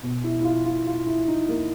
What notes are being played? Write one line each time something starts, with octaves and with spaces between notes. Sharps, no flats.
B2
E4
E4
F4
F4
F4
E4
D#4
A#3